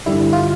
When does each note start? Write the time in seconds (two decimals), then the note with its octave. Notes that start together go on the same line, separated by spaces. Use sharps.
0.06 G2 D3 G3 E4
0.33 F4